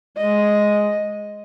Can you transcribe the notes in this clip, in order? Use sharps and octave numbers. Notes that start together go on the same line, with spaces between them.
G#3 D#5